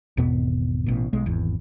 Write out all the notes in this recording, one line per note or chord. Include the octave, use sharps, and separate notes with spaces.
G#1 E2 B2 B3
A1 B2
B1 G#3
G#1 E2